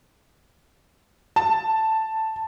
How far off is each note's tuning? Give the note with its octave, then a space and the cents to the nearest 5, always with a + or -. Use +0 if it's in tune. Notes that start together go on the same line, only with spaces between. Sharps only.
A5 +5